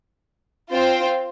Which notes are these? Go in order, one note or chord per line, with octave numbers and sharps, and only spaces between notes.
C4 F4 C5 G5